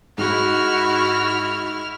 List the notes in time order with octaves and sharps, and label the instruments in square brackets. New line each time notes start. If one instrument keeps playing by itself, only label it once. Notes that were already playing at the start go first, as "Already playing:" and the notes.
[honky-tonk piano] G#2 [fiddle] E4 F6 [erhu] F#4